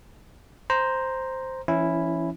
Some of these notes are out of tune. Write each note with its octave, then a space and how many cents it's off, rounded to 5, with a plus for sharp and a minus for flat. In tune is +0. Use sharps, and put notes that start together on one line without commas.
C5 +0 A#5 +5
E3 +40 C#4 +0 E4 +0